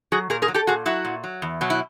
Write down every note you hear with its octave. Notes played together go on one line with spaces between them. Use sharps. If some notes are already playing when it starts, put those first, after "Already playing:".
F#3 F#4 G#4
A#2 G#4 A#4
G#4 A#4
F#3
G4 A4
A#2 F#4 G#4
F#3 E4 F#4
A#2
F#3
E2
B2 F#3
E4